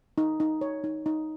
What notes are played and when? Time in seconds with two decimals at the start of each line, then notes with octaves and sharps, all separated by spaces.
0.18 D#4
0.40 D#4
0.61 C#5
0.84 D#4
1.06 D#4